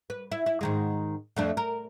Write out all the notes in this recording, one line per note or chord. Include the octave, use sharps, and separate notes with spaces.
B4
E4
E4
G#2 D#3 G#3
F2 A3 D4
A#4